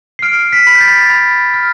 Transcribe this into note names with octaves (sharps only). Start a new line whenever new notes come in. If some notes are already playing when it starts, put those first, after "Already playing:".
C7
F6 D7
B6
B5
G6
A6
B5
F6